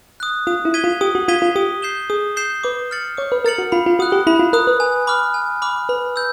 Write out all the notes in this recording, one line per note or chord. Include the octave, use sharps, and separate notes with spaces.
D#6 F#6
F4 D#6
E4
G#6 B6 D#7 G7
F4
G4 D#6
F#4
F4 G#6 B6 D#7 G7
F4
G4 D#6
G6 C7 E7 G7
G#4 D#6
G6 C7 E7 G7
B4 D6
F6 A6 C#7 F#7
C#5 D6
B4
A#4 F6 A6 C#7 F#7
F#4
F4 B5
F4
F#4 D#6 F#6
G4
E4 B5
F4
A#4 D#6 F#6
B4
G#5
B5 D6 F6
G#5
B5 D6 F6
B4 B5
E6 G6